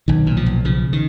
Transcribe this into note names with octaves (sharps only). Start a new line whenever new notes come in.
B1 D#3
A#2
F3
B1
C#3 F3
D#3